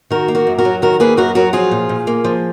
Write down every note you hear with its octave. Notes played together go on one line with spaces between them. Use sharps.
D#3 F#4 A#4
A#3
F#4 A#4
F#2
F#4 A#4
F#3
D#3 F#4 A#4
A#3 G#4 B4
F#2 F#4 A#4
F#3 F#4 A#4
F3 F4 G#4
A#2
A#2
A#3
F3